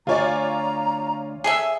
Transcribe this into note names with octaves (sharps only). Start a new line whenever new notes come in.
D2 F4 C#5 D5 G#5 A#5
G#4 A4 E5